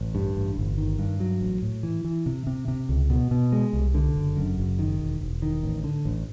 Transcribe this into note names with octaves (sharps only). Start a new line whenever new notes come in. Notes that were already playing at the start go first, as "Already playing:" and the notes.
Already playing: A1
G2
A1
G1
D#3
G2
F#3
A1
A2
E3
E3
C3
C3
C3
C#2
B2
B2
G#3
C2
D3
F#1
F#2
F#1
D#3
E1
E1
D#3
A1
D3
A1